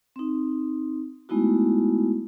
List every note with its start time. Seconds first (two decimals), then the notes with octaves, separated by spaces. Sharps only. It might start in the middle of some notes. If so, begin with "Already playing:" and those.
0.16 C4 D#4
1.29 G#3 A3 B3 D#4 E4 F#4